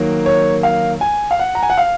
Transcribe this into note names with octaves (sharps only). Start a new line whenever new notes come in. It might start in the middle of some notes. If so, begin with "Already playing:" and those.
Already playing: D#3 F#3 A#3
C#5
F5
G#5
F5
F#5
A#5
G#5
F#5
F5